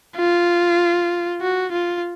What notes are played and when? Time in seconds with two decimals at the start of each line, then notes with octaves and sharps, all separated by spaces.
0.16 F4
1.41 F#4
1.72 F4